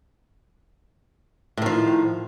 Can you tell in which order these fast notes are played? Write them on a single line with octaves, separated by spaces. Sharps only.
A2 D#3 F3